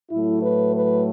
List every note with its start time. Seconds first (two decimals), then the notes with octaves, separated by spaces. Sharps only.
0.11 A2 F#3 A3 E4
0.42 B4
0.75 B4